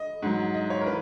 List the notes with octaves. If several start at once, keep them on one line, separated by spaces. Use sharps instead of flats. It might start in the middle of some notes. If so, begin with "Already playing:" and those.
Already playing: D#5
G#2 F#3
D#5
C#5
A#4
E3 B4